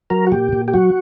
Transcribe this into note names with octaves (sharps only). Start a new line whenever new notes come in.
F#3 A#4
F#4
A#2 G4
A#2
G4
F#3 F#4